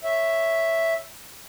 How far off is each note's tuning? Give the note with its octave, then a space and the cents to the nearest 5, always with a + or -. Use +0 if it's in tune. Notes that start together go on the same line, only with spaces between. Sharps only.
C#5 +0 E5 +0